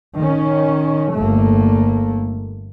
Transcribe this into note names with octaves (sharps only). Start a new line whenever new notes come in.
D#3 C#4
G1 A3 A#3